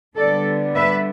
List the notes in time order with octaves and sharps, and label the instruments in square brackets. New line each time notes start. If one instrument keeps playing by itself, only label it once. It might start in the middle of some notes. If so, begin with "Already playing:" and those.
[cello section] D3 G3 B3 D4 A4 D5
B4 E5